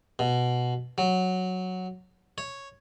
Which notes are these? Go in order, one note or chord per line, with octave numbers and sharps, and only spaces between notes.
B2
F#3
C#5